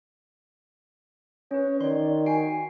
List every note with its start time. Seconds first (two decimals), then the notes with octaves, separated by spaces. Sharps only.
1.51 C#4 B4 C#5
1.81 D#3 C#5 D5 C6
2.26 F#4 G#5 C7 D7